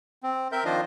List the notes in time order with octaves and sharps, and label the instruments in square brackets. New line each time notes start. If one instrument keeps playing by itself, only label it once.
[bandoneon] C4
C4 A#4 E5 G6
D#3 F3 D4 F4 C5 D#5